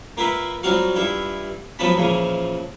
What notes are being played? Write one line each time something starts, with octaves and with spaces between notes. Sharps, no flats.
A#3 F4 B4 E5 F#5
F#3 G3 C4 F4 F#4 F5
G2 E4 F4
F3 F#3 B3 F4 A5 B5
A#2 C#3 E3 F3